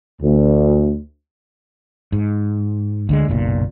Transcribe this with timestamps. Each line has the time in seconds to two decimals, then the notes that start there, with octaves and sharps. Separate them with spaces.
0.22 D2
2.12 G#2
3.09 D2 D3 G#3
3.28 F#1 B1 A#2